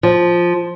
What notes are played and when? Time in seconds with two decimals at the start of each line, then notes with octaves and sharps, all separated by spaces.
0.03 F3